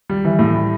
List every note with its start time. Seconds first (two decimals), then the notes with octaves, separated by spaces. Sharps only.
0.10 G3
0.25 E3
0.39 A2
0.54 G3